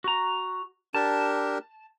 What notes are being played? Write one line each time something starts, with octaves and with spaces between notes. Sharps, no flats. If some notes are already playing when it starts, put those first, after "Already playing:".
F#4 A#5
D4 G4 A#4 A5